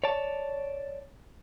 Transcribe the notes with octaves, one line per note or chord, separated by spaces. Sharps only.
C#5 D5 A5